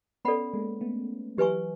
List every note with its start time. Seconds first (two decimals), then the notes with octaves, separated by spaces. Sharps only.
0.25 B3 C#4 A4 D5 F#5 B5
0.54 G#3 A#3
0.81 A3 B3
1.37 E3 F#3 G4 B4 E5 G#5 C#6